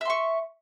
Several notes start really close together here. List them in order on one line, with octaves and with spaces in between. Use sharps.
E5 C6 C#6